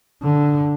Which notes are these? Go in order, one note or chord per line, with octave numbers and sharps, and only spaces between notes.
D3